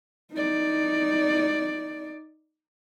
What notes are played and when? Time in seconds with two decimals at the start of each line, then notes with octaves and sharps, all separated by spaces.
0.33 D#4 D5